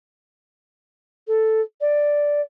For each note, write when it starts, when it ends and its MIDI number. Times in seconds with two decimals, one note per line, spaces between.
1.27 1.60 69
1.80 2.41 74